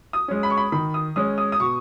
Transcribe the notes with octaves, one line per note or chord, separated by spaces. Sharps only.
D#6
G#3 C#4
B5
C#6
B5
D#3 B5
D#6
G#3 C#4 D#6
D#6
D#6
B2 C#6